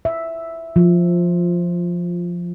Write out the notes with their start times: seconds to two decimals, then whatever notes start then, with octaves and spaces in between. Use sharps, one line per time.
0.05 E5
0.76 F3